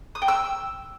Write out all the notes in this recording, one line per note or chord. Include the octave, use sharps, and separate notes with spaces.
D#6
G5
E6